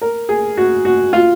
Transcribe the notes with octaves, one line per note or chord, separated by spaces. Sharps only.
A#4
G#4
F#4
F#4
F4